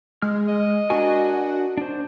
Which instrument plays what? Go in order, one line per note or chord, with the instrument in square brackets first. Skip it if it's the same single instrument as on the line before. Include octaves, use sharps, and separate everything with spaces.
[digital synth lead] G#3 [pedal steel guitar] F6
[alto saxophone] D#5
[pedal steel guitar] D4 A#4 G#5 [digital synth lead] F#4
[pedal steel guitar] D4 C5